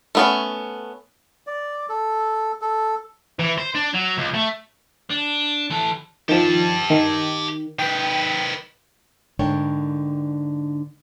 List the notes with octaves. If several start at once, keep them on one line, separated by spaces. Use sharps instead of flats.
A3 B3 C#4
D5
A4
A4
E3
C5
D4
F#3
C#2
A3
D4
E3 A4
D#3 F3 G4 A5
D#3
D#3 B4 G5
G#2 D3 D4 A#4 C#5 G5